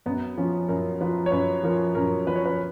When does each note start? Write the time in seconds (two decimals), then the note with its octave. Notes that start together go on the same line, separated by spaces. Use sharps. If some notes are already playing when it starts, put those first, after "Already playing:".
0.06 F#2 B3
0.37 F3 C#4
0.69 F#2 A#4
1.01 F3 B4
1.26 C#5
1.32 F#2 B4
1.63 F3 A#4
1.95 F#2 A#4
2.27 F3 B4
2.36 C#5
2.46 B4